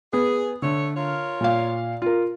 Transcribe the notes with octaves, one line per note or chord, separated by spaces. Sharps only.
B3 G#4
D3 A3 C#5
F4 A#4 C#5
A#2 F5
F4 A#4